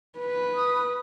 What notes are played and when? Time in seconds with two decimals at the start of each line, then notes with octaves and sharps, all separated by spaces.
0.19 B4
0.55 D#6